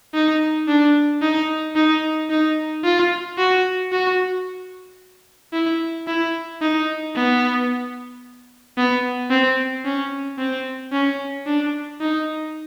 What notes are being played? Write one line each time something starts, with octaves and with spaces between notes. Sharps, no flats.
D#4
D4
D#4
D#4
D#4
F4
F#4
F#4
E4
E4
D#4
B3
B3
C4
C#4
C4
C#4
D4
D#4